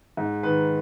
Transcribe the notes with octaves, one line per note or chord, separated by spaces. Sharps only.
G#2
D#3 B4